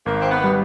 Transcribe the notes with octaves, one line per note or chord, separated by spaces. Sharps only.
G#1 A#3
C4
B3
G3